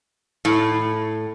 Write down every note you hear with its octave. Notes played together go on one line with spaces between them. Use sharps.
A2